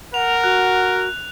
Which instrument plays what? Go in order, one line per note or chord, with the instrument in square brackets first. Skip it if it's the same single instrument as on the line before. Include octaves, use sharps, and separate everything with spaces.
[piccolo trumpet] A#4 [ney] F#5 [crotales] F7
[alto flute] F#4 [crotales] F#6